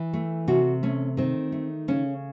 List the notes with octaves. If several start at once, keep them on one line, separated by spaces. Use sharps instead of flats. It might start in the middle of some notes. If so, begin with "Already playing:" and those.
Already playing: E3
A3
C3 F#4
A3 C#4
D#3 C4
A3
C#3 C#4